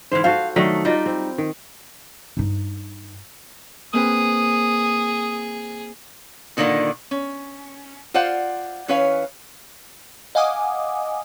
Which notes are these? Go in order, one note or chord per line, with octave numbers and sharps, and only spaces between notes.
G#2 E3 C5 F5
F#4 A4 C5 F5
D#3 F#3 A3 D4
G3 D#4 F4
C4
D#3
G2 D#4
A#3 C4 G#4 B4 D#6
A#2 D3 D#3 A#3 D5
C#4
F4 C5 D5 F5 F#5
E3 C#4 B4 C#5 F5
D#5 F5 F#5 G#5 D6 D#6